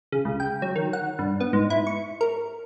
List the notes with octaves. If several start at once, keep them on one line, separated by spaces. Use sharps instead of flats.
C#3
C#2
G5
F#3
D#3
F#5
G2
B3
G#2
E4
C#6
A#4